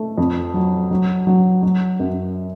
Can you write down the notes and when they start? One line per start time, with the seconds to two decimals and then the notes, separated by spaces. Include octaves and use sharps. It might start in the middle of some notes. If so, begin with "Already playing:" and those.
Already playing: A3
0.18 F2
0.54 F#3
0.91 F#3
1.27 F#3
1.63 F#3
2.00 F#2